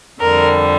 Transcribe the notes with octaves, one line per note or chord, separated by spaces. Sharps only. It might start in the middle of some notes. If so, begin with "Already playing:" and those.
F2 D3 G3 A#4